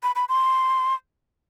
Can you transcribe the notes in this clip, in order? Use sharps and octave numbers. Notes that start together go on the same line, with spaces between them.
B5
B5
C6